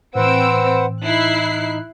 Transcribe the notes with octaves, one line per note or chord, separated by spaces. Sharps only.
A2 E3 C4 B4 C5 F#5 E6 D7
D#4 E4 F#6 C7